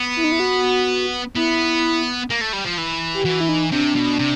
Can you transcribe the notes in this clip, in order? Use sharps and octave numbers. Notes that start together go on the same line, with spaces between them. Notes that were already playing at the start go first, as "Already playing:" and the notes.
Already playing: B3
E4
D#4
E4
F#4
B3 E4
A#3
A3
G3
F3
E3
G4
E3 F#4
E4
D#4
C3 D4
B2
C3